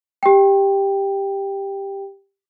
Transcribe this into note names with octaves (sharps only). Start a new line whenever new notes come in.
G4 G5